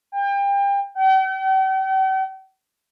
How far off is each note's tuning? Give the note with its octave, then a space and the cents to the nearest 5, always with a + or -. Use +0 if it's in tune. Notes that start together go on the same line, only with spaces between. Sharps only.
G5 +30
G5 -45